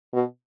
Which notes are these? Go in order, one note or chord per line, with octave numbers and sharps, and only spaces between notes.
B2